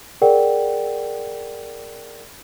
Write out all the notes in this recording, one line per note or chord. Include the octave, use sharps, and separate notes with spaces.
G#4 A#4 D5 F#5 G5